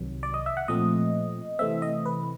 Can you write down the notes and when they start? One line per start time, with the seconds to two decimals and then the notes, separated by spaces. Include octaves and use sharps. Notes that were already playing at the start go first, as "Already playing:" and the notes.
Already playing: C2 C3 D#3 F#3
0.23 D5
0.34 D#5
0.46 E5
0.57 F#5
0.68 A#2 F3 A3 C4 D#5
1.59 C3 E3 A3 C4 E5
1.82 D#5
2.06 B4